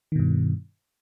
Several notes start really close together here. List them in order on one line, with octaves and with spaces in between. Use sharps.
D#3 B2 G2